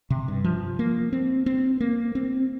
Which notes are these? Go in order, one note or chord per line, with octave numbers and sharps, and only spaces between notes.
C3
G2
F3
A#3
C4
C4
A#3
C4